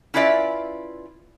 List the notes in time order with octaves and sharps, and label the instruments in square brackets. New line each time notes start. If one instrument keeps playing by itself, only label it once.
[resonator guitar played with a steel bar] C#4 E4 F4 B4 D5 E5